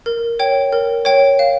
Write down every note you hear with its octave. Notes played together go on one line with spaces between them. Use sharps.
A#4
C#5 G5
A#4
C#5 G5
F5